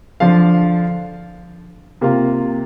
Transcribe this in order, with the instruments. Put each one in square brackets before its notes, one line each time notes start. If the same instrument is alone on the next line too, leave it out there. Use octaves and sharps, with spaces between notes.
[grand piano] D3 F3 D4 F4 F5
C3 A#3 F4